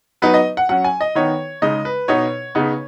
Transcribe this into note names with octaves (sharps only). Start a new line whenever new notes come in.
F#3 B3 D#4 B4
D#5
F#5
F#3 C#4 F#5
G#5
D#5
D#3 B3 D#4 C#5
C#3 G#3 D#4 D#5
B4
B2 B3 D#4 C#5
C#3 B3 D#4